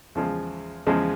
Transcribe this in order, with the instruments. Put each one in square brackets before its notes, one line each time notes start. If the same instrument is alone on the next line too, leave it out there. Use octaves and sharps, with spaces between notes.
[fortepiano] E2 C#3 F3 G#3
E2 C#3 F3 G#3